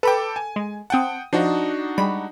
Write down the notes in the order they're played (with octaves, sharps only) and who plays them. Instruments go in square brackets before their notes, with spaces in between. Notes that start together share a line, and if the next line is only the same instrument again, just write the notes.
[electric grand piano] A4 G5 [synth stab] B4 B5 D6
[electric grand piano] G#5
[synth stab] G#3
[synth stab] C4 A5 [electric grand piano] F#5 G5 D#6
[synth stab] F3 [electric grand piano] D4 D#4 F#4
[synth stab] G3 G#3 B5